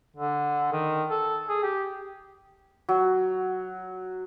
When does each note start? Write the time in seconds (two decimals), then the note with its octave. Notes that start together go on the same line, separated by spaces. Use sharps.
0.16 D3
0.72 D#3
1.10 A4
1.48 G#4
1.63 G4
2.89 F#3